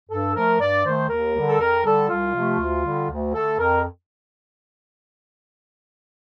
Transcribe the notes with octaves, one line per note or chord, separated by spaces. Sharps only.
G2 A4
F3 A3 A#4
G2 D5
D#3 A3 C5
D#2 A#4
D3 G3
A4
F2 A#4
D3 G3 A4
C2 F4
C3 F3 A3
D2
D3 G3
D2
D3 A3 A4
F2 A#4